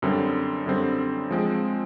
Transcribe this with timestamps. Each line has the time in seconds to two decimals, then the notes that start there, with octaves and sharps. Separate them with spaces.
0.02 F#2 D3 G3 C4
0.66 F#2 D3 G3 C4
1.31 F3 G#3 C4